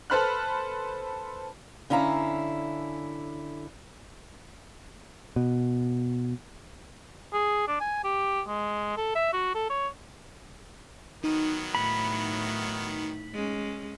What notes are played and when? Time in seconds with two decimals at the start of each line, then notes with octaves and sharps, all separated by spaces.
0.10 A4 B4 C5 B5 F6 F#6
1.90 D3 C#4 E4 F5 A#5
5.36 B2
7.33 G#4
7.68 D4
7.80 G#5
8.04 G4
8.48 G#3
8.97 A4
9.15 E5
9.33 F#4
9.55 A4
9.70 C#5
11.24 D#3 F#3 B3 D#4
11.75 A2 B5
13.34 G#3 C#4